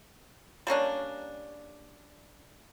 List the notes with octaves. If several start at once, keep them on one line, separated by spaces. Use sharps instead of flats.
G3 A#3 C#4 D4